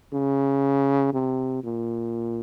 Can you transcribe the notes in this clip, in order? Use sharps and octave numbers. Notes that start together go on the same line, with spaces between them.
C#3
C3
A#2